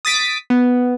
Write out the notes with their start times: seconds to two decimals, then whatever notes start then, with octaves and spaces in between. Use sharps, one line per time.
0.05 D#6 A6 B6 D7
0.50 B3